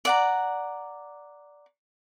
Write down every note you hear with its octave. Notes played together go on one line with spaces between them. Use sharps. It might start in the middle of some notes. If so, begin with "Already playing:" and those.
D5 F#5 A#5